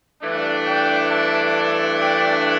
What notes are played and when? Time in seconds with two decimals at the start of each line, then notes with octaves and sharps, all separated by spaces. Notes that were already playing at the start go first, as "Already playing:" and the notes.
0.22 G2 E3 A3 D4
0.66 D5 G5
1.10 E5 A5
1.55 E5 A5
1.99 D5 G5